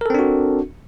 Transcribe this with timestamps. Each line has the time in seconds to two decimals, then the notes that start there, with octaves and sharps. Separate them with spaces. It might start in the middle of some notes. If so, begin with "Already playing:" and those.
0.01 A#4
0.06 A4
0.10 C4
0.14 D4
0.19 F#4